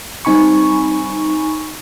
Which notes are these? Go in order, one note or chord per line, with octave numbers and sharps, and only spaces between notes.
G3 C4 D#4 G#5 B5 C#6